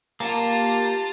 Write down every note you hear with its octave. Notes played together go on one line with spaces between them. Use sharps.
A#3 F4 G4 A5 A#5